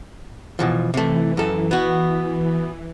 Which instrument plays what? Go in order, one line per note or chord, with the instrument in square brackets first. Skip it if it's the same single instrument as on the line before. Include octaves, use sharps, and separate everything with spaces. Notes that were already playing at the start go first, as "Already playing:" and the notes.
[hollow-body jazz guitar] B2 E3 F3
[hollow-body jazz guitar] C3 A3 [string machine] E3
[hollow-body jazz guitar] F#2 A4
B3 F#4